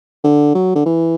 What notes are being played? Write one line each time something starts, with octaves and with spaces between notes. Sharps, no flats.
D3
F#3
D3
E3